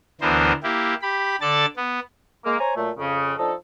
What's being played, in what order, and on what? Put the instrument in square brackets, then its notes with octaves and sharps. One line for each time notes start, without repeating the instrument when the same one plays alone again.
[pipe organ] D2 D3 E3 B3 A#4 C5
A#3 E4 G4
G4 B5
D3 A4 D5 A5 A6
B3
[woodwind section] G#3 A#3
C5 C#5 G#5 A#5
A#2 F#3 A3
F2 C#3
F3 D4 D#4 A4